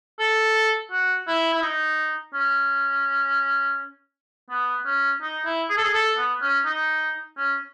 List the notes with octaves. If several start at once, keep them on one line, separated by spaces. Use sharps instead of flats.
A4
F#4
E4
E4
D#4
C#4
B3
C#4
D#4
E4
G#4
A4
G#4
A4
B3
C#4
D#4
C#4